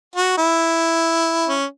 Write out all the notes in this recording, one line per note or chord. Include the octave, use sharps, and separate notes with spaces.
F#4
E4
C#4